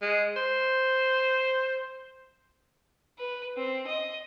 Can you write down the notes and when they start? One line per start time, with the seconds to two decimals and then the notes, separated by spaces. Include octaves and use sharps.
0.02 G#3
0.37 C5
3.19 B4
3.57 C4
3.87 D#5